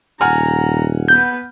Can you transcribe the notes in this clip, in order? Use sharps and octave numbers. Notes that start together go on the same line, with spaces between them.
D#1 F#5 G#5 A#5 F6
B3 B4 G6